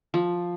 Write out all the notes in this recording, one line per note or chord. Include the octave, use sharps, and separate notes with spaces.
F3